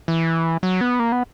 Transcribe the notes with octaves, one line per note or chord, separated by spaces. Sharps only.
E3
F#3
B3
A#3
B3